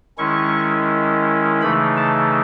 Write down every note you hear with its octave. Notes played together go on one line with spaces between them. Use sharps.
D#3 G#3 C#4 E4 C#6
C#3 E3 A3 D#4 B5
A5